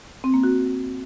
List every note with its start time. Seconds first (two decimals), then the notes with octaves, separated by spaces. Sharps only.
0.24 C4
0.34 A#3
0.43 F#4